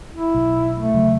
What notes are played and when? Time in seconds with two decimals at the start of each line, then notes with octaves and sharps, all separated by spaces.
0.13 E4
0.35 B1
0.77 A3
0.93 E2 C#3 F#3